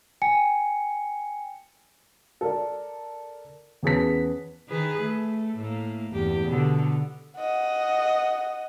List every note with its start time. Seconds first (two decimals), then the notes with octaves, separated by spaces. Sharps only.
0.22 G5 G#5 C#7
2.41 A4 A#4 D5
3.83 E2 C#4 G#4 B4 A5 B6
4.69 D#3 G#4 B4
5.01 A3
5.58 A2 A3 A#3
6.11 E2 G2 G4
6.45 B2 D3
7.37 D#5 F#5